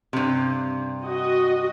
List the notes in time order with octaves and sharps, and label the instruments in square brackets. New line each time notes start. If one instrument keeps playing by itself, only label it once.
[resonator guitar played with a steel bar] G2 C3
[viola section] F#4 D#5